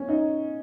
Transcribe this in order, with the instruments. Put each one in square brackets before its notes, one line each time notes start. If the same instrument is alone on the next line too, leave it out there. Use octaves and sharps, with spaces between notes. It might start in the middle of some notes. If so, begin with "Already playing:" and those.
Already playing: [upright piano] C#4
D#4